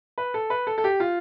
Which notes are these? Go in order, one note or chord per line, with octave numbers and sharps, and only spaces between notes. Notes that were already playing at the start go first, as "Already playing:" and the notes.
B4
A4
B4
A4
A4
G4
F4